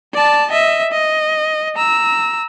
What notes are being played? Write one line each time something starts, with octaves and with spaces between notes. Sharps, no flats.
D5 A5
D#5 E5
D#5
A#5 E6